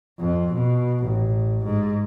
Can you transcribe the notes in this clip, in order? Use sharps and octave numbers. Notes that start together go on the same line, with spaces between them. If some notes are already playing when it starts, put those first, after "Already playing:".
F2
B2
A1
G#2